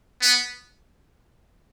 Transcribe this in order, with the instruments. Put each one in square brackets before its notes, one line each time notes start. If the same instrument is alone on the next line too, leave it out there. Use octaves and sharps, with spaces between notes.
[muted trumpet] B3